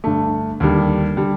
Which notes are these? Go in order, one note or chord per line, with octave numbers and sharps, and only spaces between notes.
G2 D3 A3
D#2 D3 G3
D3 G3